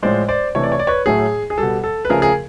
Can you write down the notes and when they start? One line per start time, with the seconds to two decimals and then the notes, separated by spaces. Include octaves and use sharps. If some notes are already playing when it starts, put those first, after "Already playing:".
0.02 A2 F3 G#3 C5 D5
0.28 C5 D5
0.55 C3 E3 A3 C#5
0.63 D5
0.72 C#5
0.79 D5
0.87 B4 C#5
1.06 A2 F#3 A3 G#4
1.50 G#4
1.58 B2 G3 A4
1.84 A4
2.05 B4
2.10 C#3 F3 A3 G#4 A#4
2.22 G#4 A#4